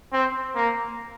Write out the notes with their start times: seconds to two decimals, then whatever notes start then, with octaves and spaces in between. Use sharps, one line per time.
0.13 C4
0.55 A#3